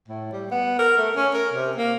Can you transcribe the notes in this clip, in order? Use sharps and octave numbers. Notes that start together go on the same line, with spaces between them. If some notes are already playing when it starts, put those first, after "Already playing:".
A2
G3
B3
A#4
A3
C#4
A#4
C3
A#3